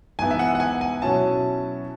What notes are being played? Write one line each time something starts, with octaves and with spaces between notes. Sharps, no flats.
G#2 E3 B3 E4 G#5
E5
F#5
F#5
G#5
G#5
B2 F#3 C#4 E4 A5